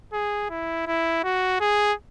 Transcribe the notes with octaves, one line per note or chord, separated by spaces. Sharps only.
G#4
E4
E4
F#4
G#4